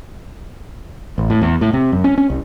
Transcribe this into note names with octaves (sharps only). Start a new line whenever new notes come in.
A1
A2
E2
A2
C3
F#2
C#4
C#4
C2